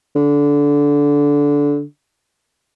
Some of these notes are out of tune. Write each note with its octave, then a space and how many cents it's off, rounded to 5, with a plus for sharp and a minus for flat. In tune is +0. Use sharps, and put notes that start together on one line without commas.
D3 -20